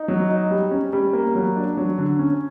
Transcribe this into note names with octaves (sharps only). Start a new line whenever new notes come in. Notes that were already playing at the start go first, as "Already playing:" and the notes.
Already playing: D#4
F#3
D#4
G3
C#4
G3
A#3
F#3
D4
F#3
D3
C#4